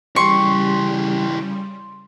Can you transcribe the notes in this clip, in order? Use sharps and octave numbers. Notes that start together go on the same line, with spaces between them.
C#3 E3 G3 G4 C6 C#6